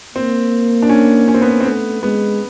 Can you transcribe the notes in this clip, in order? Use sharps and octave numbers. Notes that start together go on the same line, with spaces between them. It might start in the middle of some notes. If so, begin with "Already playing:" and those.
A#3 C4
D4
C#4
C#4
C4
B3
C4
C4
A3 B3
G#3 B3